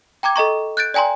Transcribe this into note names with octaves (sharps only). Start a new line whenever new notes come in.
G5 A#5 D6 G#6
A4 D#5 A#5 C#6
F#6 G6 A6 D7
D5 G5 G#5 A#5 C6